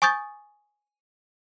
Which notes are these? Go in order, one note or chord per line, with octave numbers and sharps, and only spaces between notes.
G#5 C#6 D#6 G6 A6